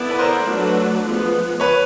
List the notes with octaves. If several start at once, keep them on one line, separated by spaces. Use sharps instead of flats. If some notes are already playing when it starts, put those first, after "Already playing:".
Already playing: B3 E4 A4 D5
B4
A#4 C5
F#3 A3 D4 F#4 B4
F3 G#3 B3
B4 C#5